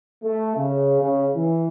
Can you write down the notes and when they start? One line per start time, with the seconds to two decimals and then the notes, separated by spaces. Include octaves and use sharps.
0.24 A3
0.56 C#3
1.01 C#3
1.36 E3